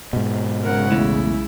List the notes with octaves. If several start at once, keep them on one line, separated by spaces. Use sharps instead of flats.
G#2 B2
B1 C#3 G#3 A#4 F#5
E2 A2 E4